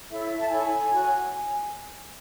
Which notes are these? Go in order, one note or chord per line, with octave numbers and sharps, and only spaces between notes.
E4 A4 C#5 E5
A5
E4 A4 C#5 G#5
F#4 C#5